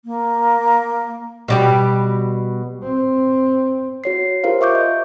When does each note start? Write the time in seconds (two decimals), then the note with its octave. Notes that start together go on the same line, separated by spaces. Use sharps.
0.05 A#3
1.48 B2 G3 G4
2.83 C4
4.04 F#4 C#5 C7
4.44 F4 G4 A#4 C5 F5
4.61 E5 C#6 D6 G6
4.75 D#5